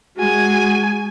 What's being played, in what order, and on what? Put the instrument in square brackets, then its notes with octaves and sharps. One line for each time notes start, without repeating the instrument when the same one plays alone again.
[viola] G#3 G#5 [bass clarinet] F#4